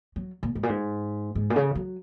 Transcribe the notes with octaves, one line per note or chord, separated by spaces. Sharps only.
F#3
A#2
G#2
A#2
G#2
G#2
A#2
C#3
F#3